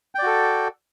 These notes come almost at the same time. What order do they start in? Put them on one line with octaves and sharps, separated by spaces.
G5 D5 F#4 A4